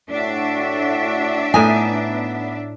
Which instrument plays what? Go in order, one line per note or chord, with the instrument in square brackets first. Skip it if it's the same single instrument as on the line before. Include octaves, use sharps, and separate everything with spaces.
[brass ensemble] A2 F#4 [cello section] D4 E5
[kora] A2 D#4 [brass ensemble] B3 [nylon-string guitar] G#5